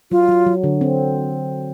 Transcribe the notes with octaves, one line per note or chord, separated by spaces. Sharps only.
F#3 F4
F#3
F#3
D3
C4